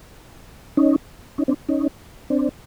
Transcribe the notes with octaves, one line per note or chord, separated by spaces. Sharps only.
C#4 D#4
C#4 D#4
C4 D4
C#4 D#4
C4 D4